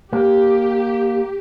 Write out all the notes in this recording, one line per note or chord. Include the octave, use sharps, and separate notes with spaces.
A#3 G4